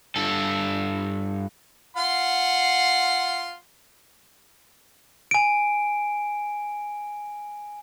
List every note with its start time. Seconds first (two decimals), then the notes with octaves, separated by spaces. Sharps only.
0.16 G2 A4
1.97 F4 F#5 C6
5.31 G#5 D7